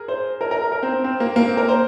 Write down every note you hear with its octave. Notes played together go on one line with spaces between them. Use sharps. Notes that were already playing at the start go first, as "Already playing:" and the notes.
Already playing: G#4 A#4
C5
A#4
A#4
A#4
A#4
C4
C4
C4
A#3
A#3
C4
A#4
C5